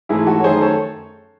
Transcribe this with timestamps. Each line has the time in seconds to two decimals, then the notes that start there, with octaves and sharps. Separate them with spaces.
0.09 G#2 E3 A3 E4 G#4
0.27 F#4 A4
0.40 C#5
0.44 F#2 D#3 A3 G#4 C5
0.61 A4 C#5